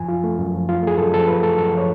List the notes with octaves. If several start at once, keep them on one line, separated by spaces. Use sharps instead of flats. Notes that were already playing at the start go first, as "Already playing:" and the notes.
Already playing: F#2 F3 G#5
F4
A3
F#2
F3
F4
A3 G#4
F#2 A4
F3 A4
F4 B4
A3 A4
F#2 A4
F3 C#5